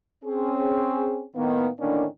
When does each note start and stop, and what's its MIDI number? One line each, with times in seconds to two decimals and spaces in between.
0.24 1.24 60
0.24 1.24 61
0.24 1.24 68
1.35 1.67 45
1.35 1.67 51
1.35 1.67 58
1.35 1.67 59
1.79 2.04 45
1.79 2.04 50
1.79 2.04 51
1.79 2.04 58
1.79 2.04 61
1.79 2.04 62